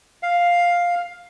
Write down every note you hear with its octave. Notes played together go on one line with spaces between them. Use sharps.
F5